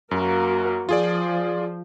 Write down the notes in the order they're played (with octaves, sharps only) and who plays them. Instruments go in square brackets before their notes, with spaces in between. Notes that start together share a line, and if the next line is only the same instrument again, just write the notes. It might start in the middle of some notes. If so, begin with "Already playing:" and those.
[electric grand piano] F#2 [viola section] A#3 F#4 A#4
[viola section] F3 [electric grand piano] F4 G#4 D5